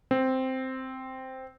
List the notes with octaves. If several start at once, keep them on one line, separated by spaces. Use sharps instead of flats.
C4